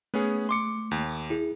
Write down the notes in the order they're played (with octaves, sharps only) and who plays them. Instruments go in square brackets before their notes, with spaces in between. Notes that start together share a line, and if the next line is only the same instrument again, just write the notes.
[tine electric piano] A3 [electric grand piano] B3 C#4 G#4
[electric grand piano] C6 D6 C#7
D#2
[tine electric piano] E4 G#4